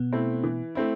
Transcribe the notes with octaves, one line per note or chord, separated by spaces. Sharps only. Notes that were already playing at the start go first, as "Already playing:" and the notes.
Already playing: B2 B3
A3 C4 E4
E3
A3 C4 E4